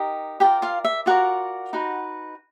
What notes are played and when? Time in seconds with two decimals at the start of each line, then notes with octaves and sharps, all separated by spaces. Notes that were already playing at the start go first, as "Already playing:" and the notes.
Already playing: D#4 G4 A#4 D#5
0.40 F4 G4 A#4 D5 G5
0.62 F4 F5
0.85 E5
1.06 F4 F#4 A#4 D5 F#5
1.73 D#4 F#4 B4